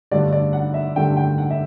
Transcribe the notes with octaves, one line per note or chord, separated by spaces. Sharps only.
G2 D3 A3 D5
D5
F#5
E5
G2 D3 A3 G5
G5
F#5
E5